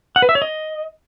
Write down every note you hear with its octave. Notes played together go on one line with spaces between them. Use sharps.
F#5
B4
E5
C#5
D#5